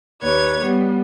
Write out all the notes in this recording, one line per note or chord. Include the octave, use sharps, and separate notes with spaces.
D#2 B4 C#5 G#6
G3 B3